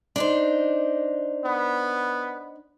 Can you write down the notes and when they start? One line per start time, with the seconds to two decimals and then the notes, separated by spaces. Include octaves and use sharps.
0.16 D4 D#4 C5
1.44 B3